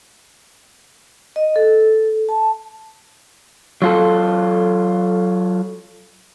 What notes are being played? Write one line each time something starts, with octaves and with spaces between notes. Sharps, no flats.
D#5
A4
A5
F#3 F4 A4